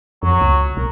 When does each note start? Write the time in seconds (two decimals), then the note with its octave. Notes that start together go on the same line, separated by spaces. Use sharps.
0.23 F2 F#3
0.41 C#2
0.77 B1 A#4